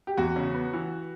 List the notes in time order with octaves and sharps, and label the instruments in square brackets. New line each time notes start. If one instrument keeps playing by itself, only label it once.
[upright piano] G4
[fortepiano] E2 [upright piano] F#4
[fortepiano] C#3
B3
E3